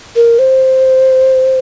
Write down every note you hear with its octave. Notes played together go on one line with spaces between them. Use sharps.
A#4
C5